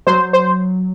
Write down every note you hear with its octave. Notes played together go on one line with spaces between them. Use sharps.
F#3 C5
C5